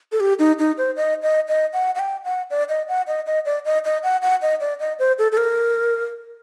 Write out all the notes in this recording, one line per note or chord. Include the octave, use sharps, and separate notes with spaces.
A4
G4
D#4
D#4
C5
D#5
D#5
D#5
F#5
F#5
G5
F#5
D5
D#5
F#5
D#5
D#5
D5
D#5
D#5
F#5
F#5
D#5
D5
D#5
C5
A4
A4
A#4